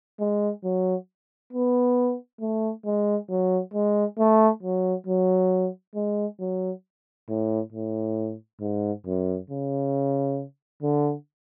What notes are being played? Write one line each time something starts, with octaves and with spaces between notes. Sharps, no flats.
G#3
F#3
B3
A3
G#3
F#3
G#3
A3
F#3
F#3
G#3
F#3
A2
A2
G#2
F#2
C#3
D3